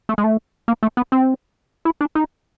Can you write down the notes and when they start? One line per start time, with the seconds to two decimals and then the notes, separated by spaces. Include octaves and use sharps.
0.09 A3
0.18 G#3
0.24 A3
0.68 A#3
0.83 A3
0.97 B3
1.12 C4
1.85 E4
2.01 D4
2.15 D#4